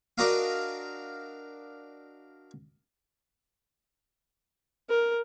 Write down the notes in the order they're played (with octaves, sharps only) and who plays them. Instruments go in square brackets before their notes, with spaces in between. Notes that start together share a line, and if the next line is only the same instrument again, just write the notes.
[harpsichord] D4 F#4 A#4 D5 D#5 F5
[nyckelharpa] A#4